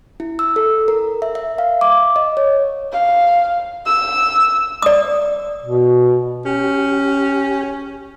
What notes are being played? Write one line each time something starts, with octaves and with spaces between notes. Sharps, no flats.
E4
E6
A4
A#4
E5
E5
F5
D6
D#5
C#5
F5
E6
D5 D#6
B2
C#4 G4